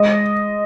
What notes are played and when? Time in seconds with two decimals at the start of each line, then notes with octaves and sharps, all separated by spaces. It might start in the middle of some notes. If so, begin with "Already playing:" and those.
Already playing: G#3 D#5